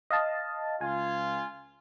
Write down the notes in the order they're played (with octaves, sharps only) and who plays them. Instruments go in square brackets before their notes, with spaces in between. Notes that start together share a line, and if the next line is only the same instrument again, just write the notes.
[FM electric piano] D#5 F5 A5
[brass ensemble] C#2 F4 [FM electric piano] G#5